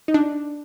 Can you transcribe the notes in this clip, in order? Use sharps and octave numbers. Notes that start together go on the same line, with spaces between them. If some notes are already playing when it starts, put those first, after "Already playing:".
D#4
D4